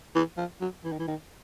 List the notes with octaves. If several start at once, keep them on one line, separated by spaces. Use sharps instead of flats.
E3
F3
F#3
E3
D#3
E3
D#3